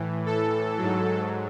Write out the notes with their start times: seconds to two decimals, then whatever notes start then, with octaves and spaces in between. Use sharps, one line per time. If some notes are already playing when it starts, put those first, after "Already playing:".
Already playing: A2 E3
0.26 A4
0.78 G#2 F#3